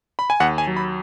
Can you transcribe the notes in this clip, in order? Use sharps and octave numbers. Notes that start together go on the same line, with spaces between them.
B5
G#5
D#2 F#5
G#5
F#3
B5